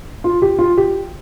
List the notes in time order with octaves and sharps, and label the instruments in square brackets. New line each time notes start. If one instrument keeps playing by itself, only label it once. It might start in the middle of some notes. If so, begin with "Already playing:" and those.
[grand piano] F4
G4
F4
G4